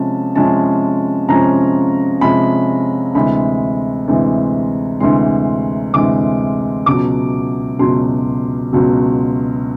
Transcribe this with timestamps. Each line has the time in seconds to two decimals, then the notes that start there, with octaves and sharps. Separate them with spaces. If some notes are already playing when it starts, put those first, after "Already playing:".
Already playing: C3 F3 G#3 C#4 A5
0.35 C3 F3 G#3 C#4 A5
1.29 C3 F3 G#3 C#4 A#5
2.21 C3 F3 G#3 C#4 B5
3.14 D2 C3 E3 G#3 B5
4.07 D2 C3 E3 G#3
5.00 D2 C3 E3 G#3 C6
5.93 D2 C3 E3 G#3 D6
6.86 C#2 B2 F#3 D6
7.79 C#2 B2 F#3 C6
8.72 C#2 B2 F#3